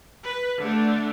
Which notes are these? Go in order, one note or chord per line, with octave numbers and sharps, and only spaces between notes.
B4
D3 A3 D4